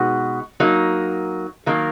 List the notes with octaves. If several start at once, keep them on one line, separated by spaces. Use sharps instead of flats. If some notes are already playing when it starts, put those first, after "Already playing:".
Already playing: B2 G#3 B3 D#4 F#4
F#3 A#3 D#4
D#3 F#3 A#3